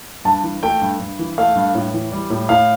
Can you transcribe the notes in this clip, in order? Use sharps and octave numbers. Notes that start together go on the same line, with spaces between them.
G2 A5
E3
A3 G5
G2
G2
E3
A3 F5
G2
A2
E3
G3
A2
A2 F5